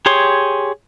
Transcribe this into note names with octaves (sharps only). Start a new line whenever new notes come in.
G4 G#4 C#5 C6